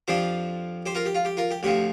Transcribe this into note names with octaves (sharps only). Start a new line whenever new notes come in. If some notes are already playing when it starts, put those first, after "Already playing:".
F2 F3 D4 G4 C5
G4 C5
F4 A#4
G4
F4
G4
F4 A#4
G4
D2 C3 F3 G4